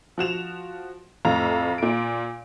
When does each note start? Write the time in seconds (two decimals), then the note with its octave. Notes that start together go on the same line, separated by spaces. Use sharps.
0.18 F3 F#4 E7 F7
1.25 F2 A2 F5 A#5
1.78 A#2 D7